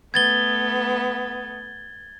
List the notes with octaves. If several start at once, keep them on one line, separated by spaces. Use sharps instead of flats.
A3 B3 G#6 A6 G7